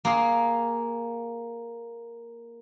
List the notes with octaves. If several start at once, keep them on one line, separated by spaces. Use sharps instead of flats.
A#3 G#4 C6